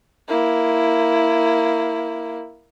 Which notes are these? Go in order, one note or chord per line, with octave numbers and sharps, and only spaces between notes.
A#3 E4